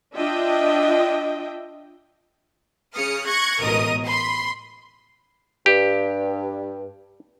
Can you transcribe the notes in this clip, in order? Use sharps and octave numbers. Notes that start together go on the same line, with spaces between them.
D4 F4 D#5 E5 G5
C#3 D#6 F6 C#7
C#6 F#6 G#6 A#6
A1 G#2 B2 A#4 D#5 D#6
B5 C6
G2 G4